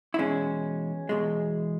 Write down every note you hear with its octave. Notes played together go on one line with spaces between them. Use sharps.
E4
E2 B2 G#3 C#4
E2 B2 G#3